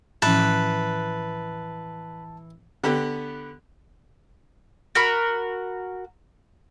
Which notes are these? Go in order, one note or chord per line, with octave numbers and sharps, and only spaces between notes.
A2 E3 F3 C#4 B4 A5
D3 B3 G4
F#4 A#4 B5